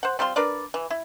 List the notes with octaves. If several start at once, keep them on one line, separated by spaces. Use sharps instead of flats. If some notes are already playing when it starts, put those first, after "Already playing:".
C5 F#5
G3 C4 F4 C6
D4 A#4 B4 D5
E3
E4